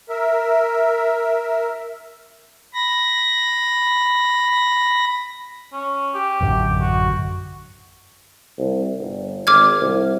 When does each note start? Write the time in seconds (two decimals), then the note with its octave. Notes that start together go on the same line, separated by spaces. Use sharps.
0.09 A#4 E5
2.74 B5 A#6
5.73 C#4
6.15 G4
6.41 A1 F#2 D3
6.81 F#4
8.58 C2
8.99 G1
9.47 G#1 D6 F6 G#6
9.81 C2